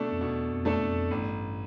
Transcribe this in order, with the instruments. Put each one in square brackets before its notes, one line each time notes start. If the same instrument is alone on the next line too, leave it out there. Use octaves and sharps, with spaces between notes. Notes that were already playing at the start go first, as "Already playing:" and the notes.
Already playing: [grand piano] B2 A3 D4 A4
[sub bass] F2
[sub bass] E2 [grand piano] B2
[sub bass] F2
[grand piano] A3 D4 A4
[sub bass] F2
[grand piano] A1 [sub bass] G2